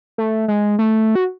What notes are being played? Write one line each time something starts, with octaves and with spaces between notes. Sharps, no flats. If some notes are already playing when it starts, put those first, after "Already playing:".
A3
G#3
A3
F#4